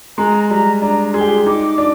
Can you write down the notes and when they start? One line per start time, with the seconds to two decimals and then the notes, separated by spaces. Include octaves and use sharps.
0.18 G#3 A#5
0.50 G3 A#5
0.82 D4 A#5
1.14 G#4 C6
1.21 G4
1.29 G#4
1.46 D#4 D6
1.78 D4